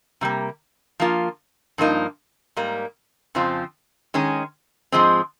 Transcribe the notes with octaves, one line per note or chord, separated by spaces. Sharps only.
C3 G3 A#3
F3 A#3 F4
G2 F3 A#3 D#4
G#2 G3 A#3
F2 C#3 F3 C4 F4
D#3 G#3 C#4 G#4
G#2 F3 G#3 C4